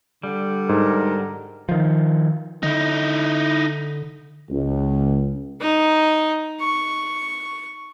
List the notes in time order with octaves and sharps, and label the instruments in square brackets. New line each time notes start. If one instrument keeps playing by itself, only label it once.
[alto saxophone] D3 [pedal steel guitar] G3
[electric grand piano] G#2 [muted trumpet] A#4
[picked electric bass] D#3 F3
[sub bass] D3 [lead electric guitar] D#4 E4
[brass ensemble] C#2
[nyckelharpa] D#4
C#6